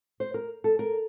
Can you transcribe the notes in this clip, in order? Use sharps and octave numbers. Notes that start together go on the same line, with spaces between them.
C5
A#4
A4
A#4